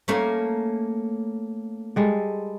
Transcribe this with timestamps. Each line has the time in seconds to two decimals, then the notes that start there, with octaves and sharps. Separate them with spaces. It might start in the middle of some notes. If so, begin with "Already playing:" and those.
0.08 A3 A#3 C#4
1.96 G3 G#3 A4